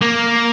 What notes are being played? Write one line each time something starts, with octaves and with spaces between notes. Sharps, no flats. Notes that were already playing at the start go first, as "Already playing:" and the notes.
A#3